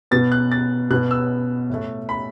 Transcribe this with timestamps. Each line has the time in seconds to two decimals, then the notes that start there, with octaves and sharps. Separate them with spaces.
0.11 B2 B3 A6
0.32 F#6
0.52 A6
0.90 B2 B3 F#6
1.11 E6
1.70 A2 A3
2.09 B5